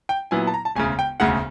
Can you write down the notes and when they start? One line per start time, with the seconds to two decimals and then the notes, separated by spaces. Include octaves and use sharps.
0.09 G5
0.31 A#2 F#3 B3 E4 G#5
0.47 A5
0.54 A#5
0.65 A5
0.75 E1 D2 C#3 G#5
0.99 G5
1.20 E1 D2 C#3 F#5